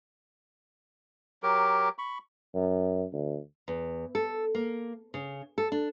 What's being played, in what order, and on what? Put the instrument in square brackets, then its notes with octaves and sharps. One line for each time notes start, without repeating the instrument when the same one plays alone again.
[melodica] F#3 G4 A#4
B5 C#6
[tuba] F#2
D2
[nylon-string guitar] E2
A4
A#3
C#3
A4
D4